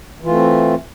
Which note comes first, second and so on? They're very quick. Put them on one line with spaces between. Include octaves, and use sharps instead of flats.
E3 F4 A3 C4